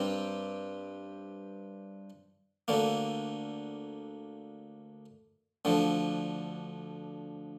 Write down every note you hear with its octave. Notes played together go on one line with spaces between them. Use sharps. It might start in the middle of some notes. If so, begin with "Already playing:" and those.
Already playing: G2 G3 C4 G4 A#4
D2 D3 A#3
D2 D3 F3